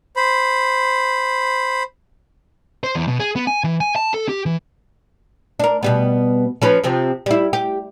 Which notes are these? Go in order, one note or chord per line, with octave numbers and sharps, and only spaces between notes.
C5 B5
C5
E2
B2
G#4
B3
G#5
E3
G#5
A5
A4
G4
E3
D4 A#4
B2 G3 B3
F3 C#4 B4
C3 F3 C4
G3 E4
G4